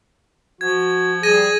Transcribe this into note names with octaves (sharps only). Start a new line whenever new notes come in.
F3 F#4 G#6
G3 G#4 G#6 A#6 D#7